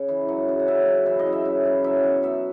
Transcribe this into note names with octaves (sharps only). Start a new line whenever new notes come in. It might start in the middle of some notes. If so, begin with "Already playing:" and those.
Already playing: C#3
E3
F#3
C#3
F#5
C#3 E5
F#3
E3 E5
D#5
C#3
E5
C#3
E3
F#3 E5
B2 F#5
B2 E5